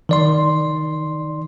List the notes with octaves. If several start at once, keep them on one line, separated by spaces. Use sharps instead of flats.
D#3 D5 C6